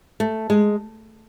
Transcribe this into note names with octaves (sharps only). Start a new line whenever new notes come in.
A3
G#3